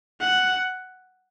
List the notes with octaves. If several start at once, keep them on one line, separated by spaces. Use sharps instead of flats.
F#5